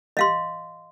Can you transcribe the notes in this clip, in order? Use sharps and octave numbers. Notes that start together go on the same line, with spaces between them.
D#5 F5 C6